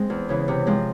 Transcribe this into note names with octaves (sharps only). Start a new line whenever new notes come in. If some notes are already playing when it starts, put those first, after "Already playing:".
Already playing: G#3 C4
E2
C#3 E3
C3
F3 G#3 C4